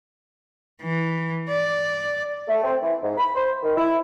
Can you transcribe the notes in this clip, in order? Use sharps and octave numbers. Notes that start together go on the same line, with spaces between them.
E3
D5
A3
C4
E3
G#2
B5
C5
D#3
E4